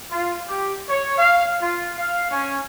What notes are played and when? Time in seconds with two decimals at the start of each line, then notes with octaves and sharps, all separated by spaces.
0.11 F4
0.47 G4
0.88 C#5
1.18 F5
1.61 F4
1.98 F5
2.31 C#4